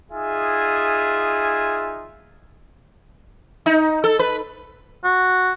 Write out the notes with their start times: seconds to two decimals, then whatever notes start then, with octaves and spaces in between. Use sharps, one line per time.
0.11 D#4 F4 G#4 E5 G#5
3.66 D#4
4.04 A4
4.19 B4
5.04 F#4